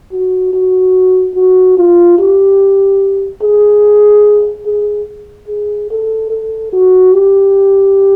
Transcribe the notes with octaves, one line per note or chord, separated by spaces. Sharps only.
F#4
F#4
F#4
F4
G4
G#4
G#4
G#4
A4
A4
F#4
G4